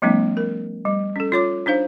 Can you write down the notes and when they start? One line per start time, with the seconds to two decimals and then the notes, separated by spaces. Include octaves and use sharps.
0.02 F3 G3 A3 B3 C#4 D#4
0.37 A#4
0.85 G3
1.16 C#4 A4
1.32 F4 C#5 D6
1.66 D4 D#4 C5 F5